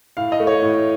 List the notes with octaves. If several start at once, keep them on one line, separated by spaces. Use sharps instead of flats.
A2 F5
D#5
A3
C#5
A2